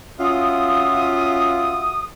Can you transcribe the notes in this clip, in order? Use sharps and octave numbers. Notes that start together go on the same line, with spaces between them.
C#4 F4 F#4 E5 D#6